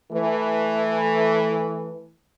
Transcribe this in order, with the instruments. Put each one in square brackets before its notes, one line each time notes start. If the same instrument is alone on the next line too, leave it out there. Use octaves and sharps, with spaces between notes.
[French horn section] E3 A3